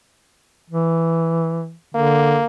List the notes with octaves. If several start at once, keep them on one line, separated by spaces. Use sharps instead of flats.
E3
D3 A#3